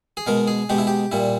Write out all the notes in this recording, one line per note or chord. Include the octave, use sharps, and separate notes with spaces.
G#4
B2 G#3 A#4
G#4
B2 G#3 G4
E4
G4
A#2 G3 E4